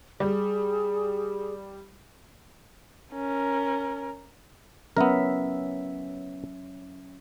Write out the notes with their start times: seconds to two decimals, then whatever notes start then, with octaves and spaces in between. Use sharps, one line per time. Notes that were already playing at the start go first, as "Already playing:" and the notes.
0.20 G3 G#4
3.13 C#4 A#4
4.97 F#3 B3 C#4 A#4 E5